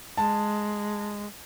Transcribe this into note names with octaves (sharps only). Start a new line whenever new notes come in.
G#3 A5